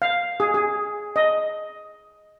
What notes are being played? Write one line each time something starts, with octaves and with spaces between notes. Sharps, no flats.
F5
G#4
G#4
D#5